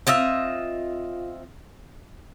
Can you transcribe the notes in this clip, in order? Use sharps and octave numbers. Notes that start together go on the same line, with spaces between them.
C4 F4 D#5 E5